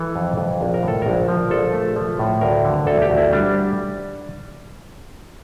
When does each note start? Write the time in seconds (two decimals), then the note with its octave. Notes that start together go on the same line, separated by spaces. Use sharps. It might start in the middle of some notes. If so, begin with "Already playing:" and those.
Already playing: E3 A4
0.16 F2
0.38 F2
0.61 A#1
0.74 A#4
0.83 A2 A4
1.02 A#1 A#4
1.28 F3
1.51 A#1 A4
1.73 A3
1.96 F3
2.19 A2
2.41 D2 A#4
2.65 D3
2.87 D2 A4
3.02 G4
3.10 D2
3.18 E4
3.33 G3 D4